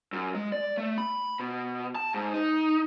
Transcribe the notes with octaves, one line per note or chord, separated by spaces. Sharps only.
F#2
G#3
D5
A3
B5
B2
A5
G#2
D#4